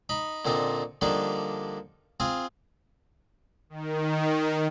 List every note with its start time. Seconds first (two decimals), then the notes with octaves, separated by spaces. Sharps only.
0.09 D#4 B5
0.45 A#2 D3 C4 D#4
1.01 D3 F3 G3 A#3 D4 D#4
2.20 C4 F4 G#4 F5
3.70 D#3